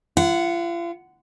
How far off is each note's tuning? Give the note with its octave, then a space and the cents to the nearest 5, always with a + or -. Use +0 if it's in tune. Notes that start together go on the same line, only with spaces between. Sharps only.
F4 -40 F#5 +0